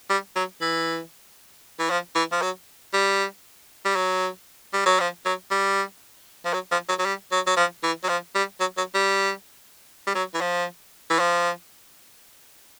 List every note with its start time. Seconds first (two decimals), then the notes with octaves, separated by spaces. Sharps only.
0.10 G3
0.36 F#3
0.61 E3
1.80 E3
1.90 F3
2.16 E3
2.32 F3
2.42 F#3
2.94 G3
3.85 G3
3.96 F#3
4.74 G3
4.86 F#3
5.00 F3
5.26 F#3
5.51 G3
6.45 F3
6.54 F#3
6.72 F3
6.89 F#3
6.99 F#3
7.06 G3
7.32 F#3
7.47 F#3
7.57 F3
7.84 E3
8.04 F#3
8.09 F3
8.35 G3
8.60 F#3
8.78 F#3
8.95 G3
10.07 G3
10.15 F#3
10.34 E3
10.41 F3
11.10 E3
11.19 F3